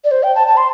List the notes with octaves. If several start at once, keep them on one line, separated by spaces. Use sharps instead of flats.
D5
C5
G5
A5
A5
C6